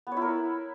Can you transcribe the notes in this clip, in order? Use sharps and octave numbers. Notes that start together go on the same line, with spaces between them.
B3
C#5
E4
A#4